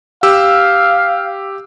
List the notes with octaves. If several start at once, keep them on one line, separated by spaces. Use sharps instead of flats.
G4 F5 E6